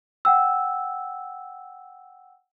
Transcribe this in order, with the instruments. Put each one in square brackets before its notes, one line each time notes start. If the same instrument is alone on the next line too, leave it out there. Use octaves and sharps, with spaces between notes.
[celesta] F#5 G5 E6